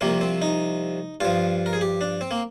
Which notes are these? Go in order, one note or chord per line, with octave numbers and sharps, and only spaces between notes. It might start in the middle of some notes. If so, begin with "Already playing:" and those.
C2 C3 F3 A#3
C4
D#4
G2 F3 F4
A#4
G#4
G4
D4
C4
A#3